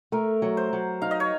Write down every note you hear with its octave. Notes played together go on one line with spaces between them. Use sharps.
A3 A#4
F#3
C5
F#3
D#4 F5
D#5
C#5